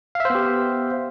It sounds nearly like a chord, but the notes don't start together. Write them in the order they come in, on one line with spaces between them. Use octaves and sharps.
F5 E5 C5 B3 G4